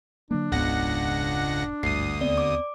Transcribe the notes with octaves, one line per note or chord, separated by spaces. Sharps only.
D3 F#3 A#3 D4
E1 C#2 G#2 B3 F#5 A#6
G#1 D2 G2 D#6 C7
D#2 B3 C4 D5
D6